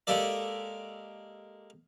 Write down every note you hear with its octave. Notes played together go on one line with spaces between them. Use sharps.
G#3 A#3 G4 A4 D5